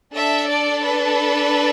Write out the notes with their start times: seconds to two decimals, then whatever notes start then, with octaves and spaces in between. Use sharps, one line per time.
0.14 D4 A4 E5
0.48 D5
0.83 B4